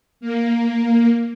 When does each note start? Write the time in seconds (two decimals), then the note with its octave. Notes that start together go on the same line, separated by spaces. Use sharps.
0.21 A#3